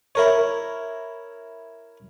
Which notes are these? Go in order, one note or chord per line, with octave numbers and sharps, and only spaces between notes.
E4 A#4 C#5